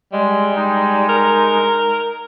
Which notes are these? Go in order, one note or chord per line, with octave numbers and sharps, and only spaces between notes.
G3 G#3
G#3 D#4
A#4